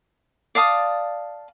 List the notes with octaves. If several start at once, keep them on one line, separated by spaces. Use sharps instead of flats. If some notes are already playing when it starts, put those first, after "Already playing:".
D5 F5 A5 D#6